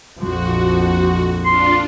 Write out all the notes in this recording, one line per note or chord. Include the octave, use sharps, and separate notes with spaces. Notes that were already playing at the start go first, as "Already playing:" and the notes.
A#1 F2 F3 F#4
D4 F4 C6